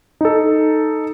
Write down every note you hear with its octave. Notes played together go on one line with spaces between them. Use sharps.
D#4 A4